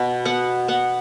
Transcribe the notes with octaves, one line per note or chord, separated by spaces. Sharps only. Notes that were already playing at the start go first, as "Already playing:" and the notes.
Already playing: B2
B3 F#5
B3 F#5